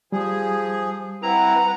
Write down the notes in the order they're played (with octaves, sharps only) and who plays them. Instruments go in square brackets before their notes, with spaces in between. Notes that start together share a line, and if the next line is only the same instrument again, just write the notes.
[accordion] F3 G#4 [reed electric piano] G3
[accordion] C4 E4 [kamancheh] B4 F#5 [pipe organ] A#5